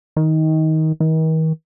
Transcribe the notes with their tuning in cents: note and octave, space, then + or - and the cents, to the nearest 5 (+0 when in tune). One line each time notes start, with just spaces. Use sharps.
D#3 +20
D#3 +40